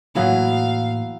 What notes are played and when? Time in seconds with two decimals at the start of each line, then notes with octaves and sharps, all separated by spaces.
0.15 A2 E3 F#3 A#3 B3 F5